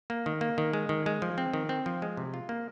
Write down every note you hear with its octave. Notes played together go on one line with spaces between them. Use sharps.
A#3
D#3
A#3
D#3
G#3
D#3
G#3
F3
C4
D#3
C4
F3
G#3
C3
F4
A#3